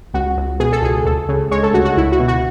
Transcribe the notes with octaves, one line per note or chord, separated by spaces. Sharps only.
C#2 F#4
C#2
B2 G#4
A4
C#2 G#4
D2 A4
C#3
G#3 C#5
A4
D2 F#4
F#4
C#2 E4
F#4
B2
F#4